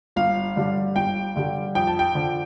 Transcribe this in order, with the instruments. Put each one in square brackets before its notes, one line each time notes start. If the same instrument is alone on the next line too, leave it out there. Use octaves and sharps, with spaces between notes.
[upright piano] G1 F5
G2 D3 G3
G1 G5
G2 D3 G3
F2 G5
A5
G5
D3 F3